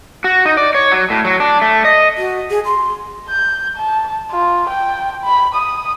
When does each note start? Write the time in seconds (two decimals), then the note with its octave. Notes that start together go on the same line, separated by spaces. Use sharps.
0.24 F#4
0.46 D#4
0.57 D5
0.75 C#5
0.91 F#3
1.10 A2
1.25 F#3
1.40 D4
1.62 A3
1.85 D#5
2.18 F#4
2.50 G#4
2.66 C6
3.29 G6
3.77 A5
4.31 F4
4.69 G5
5.24 B5
5.55 D#6